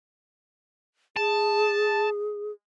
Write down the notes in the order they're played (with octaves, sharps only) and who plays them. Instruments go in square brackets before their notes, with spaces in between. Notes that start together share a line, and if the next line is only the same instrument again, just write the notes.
[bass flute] G#4 [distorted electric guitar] A5